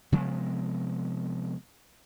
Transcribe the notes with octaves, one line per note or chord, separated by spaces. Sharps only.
C3 F3 G#3 B3